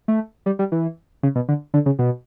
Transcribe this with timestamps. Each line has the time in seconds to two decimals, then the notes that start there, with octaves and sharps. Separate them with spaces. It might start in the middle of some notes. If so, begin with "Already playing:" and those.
0.08 A3
0.46 G3
0.59 G3
0.72 E3
1.23 C#3
1.35 B2
1.48 D3
1.74 D3
1.86 C#3
1.99 B2